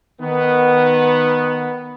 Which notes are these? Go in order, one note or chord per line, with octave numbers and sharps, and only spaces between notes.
D#3 B3